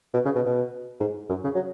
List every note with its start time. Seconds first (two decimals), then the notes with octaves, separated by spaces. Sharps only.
0.14 B2
0.25 C#3
0.36 B2
0.46 B2
1.00 G#2
1.29 F#2
1.44 C#3
1.55 F#3